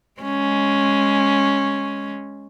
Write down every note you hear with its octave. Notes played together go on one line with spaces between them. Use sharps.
G#3 C#4